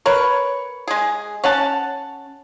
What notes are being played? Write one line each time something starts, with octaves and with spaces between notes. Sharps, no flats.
A#4 B4 C#5
G#3 G#4
C#4 F#5 A5